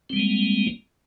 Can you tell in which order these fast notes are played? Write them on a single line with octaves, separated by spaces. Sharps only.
C4 G3 G#3 A#3